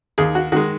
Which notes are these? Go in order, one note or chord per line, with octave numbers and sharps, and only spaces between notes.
D#2 G#4
F#4
D#3 G#3 F#4